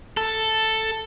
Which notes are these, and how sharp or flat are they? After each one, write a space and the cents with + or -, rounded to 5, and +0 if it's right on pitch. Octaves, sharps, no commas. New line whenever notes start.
A4 +5